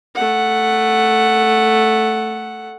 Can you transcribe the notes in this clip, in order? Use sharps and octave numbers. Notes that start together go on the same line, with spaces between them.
A3 F#5